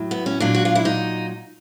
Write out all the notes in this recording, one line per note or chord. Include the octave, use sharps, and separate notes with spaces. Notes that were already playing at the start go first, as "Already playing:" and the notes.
Already playing: A2 F#3
B3
C#4
A#2 F#3 D4
F#4
F4
E4
D#4